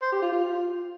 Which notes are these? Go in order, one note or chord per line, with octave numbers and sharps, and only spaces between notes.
C5
G4
F4
F4